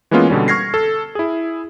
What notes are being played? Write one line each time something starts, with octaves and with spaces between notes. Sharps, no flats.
E3 G#3 A#3 B3 C#4 F4
B2 D3 G3 C#4
C#6 F6 G#6 A#6 C7
A4
E4 G#4